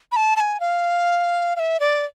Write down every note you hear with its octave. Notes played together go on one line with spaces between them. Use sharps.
B5
A5
A5
G#5
F5
F5
E5
D5